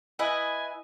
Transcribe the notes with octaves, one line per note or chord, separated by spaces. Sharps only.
E4 B4 D#5 G#5